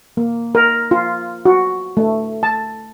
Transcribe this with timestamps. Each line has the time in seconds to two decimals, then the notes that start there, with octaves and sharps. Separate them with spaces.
0.17 A#3
0.55 A#4
0.91 F4
1.45 F#4
1.97 A3
2.43 A5